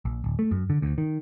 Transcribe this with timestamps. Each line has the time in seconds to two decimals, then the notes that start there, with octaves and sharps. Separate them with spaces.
0.05 A#1
0.24 D1
0.39 A3
0.51 F#2
0.70 D3
0.82 D2
0.98 D#3